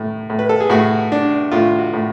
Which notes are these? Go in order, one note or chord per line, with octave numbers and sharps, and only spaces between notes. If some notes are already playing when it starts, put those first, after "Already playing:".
Already playing: A2
A2
B4
A4
G#4
A2 F#4
D4
A2 F4
F#4
A2